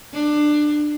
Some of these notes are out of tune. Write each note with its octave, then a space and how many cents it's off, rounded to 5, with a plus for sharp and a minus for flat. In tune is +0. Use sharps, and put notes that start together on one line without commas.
D4 +20